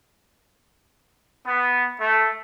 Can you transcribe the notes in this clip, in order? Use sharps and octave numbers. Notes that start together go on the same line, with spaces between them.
B3
A3